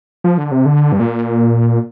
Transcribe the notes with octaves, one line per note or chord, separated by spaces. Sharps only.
F3
D3
C3
D3
G2
A#2